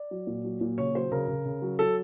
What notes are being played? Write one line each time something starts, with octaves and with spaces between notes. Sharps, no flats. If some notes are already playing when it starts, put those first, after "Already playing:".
Already playing: D5
F#3
A#2
F#3
A#2
C#3 C#5
F#3 C5
C#3 A#4
C#3
C#3
F#3
F#3 A4